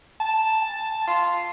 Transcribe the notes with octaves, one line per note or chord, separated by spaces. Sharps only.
A5
F4